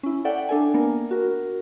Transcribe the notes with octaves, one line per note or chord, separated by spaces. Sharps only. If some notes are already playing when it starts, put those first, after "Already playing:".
C#4 E4
A4 D5 E5 F#5 G5
D4 A4 G#5
A#3 B3 D4 A#4
F#4 A#4